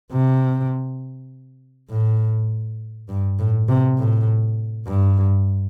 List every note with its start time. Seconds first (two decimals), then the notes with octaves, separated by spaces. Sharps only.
0.12 C3
1.90 A2
3.09 G2
3.39 A2
3.68 C3
3.98 A2
4.87 G2